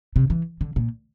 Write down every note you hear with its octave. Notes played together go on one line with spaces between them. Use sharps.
C3
E3
D3
A#2